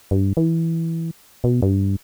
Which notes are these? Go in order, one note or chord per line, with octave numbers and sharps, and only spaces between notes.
G2
E3
B2
G2